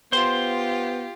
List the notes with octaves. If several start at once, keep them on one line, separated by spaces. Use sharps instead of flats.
B3 F4 G4 C5 C6